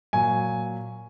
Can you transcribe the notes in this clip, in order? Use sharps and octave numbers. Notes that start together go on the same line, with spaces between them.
A#2 F#3 G#5